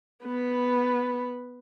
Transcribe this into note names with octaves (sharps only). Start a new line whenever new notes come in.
B3 B4